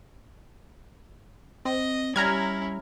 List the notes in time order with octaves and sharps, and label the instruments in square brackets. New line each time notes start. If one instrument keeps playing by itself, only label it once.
[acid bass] C4 [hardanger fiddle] D#5
[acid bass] G3 [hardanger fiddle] C#4 E4 [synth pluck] A#5 F6 G#6